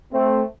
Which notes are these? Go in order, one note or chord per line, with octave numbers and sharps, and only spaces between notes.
A3 C4